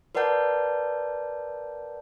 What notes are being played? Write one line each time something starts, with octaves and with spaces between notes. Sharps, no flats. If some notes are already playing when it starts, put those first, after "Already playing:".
A#4 B4 D5 F#5 A5 G6